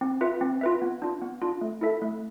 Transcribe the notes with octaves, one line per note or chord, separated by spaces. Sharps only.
C4
F4 B4 E5
C4
F4 B4 E5
B3
D4 F4
B3
D4 F4
A3
E4 A4 E5
A3